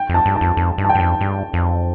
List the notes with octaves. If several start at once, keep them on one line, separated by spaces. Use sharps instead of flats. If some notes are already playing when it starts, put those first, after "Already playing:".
Already playing: G5
F2
A5
G2
A5
F2
F2
G2
A5
G5
G2
F2
G2
F2